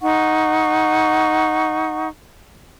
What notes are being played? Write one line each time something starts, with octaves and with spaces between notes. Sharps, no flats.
D#4 F#5 C#6